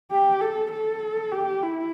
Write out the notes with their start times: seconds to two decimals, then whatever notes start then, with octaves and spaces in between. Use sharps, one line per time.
0.11 G4
0.40 A4
0.72 A4
1.31 G4
1.62 E4